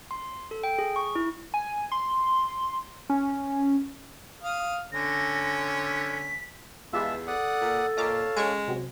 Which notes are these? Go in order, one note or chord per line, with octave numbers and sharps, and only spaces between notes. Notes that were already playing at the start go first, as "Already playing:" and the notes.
C6
A4
G5
G#4
C#6
E4
G#5
C6
C#4
F5 D#6
D3 C#4 A#6
B6
E2 G#3 F4 G4 B4 E5 A5 E6
A4 D5 F#5 D#6
A#2
A#2 C#5 D#5 F5 A5 A#5 D6
G#3 C#4 C#6 D7
C3 F#3 C4